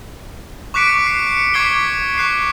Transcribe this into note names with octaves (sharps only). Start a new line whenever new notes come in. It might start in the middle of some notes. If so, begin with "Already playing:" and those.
C#6 D6 F#6 B6 C#7 D7
C7
C#7
C#6 D6 G#6 B6 C7 G7
C#6 F#6 C7